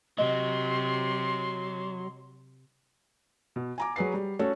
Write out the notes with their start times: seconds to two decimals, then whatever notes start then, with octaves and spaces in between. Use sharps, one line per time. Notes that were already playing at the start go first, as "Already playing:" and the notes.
0.19 C3 F#3 D#5 C6
3.56 B2
3.78 G#5 A#5 D6
3.96 F#3 F#4 G#4 B4 C7
4.14 G3
4.39 A3 C#4 F#4 A4